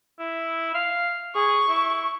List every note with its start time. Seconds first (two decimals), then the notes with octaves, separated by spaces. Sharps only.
0.20 E4
0.75 F5
1.35 G#4 C#6
1.69 E4